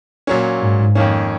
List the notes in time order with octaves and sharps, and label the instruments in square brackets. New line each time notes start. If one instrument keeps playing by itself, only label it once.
[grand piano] A#2 F#3 C#4
[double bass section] G#2
[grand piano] F2 D#3 A#3 C#4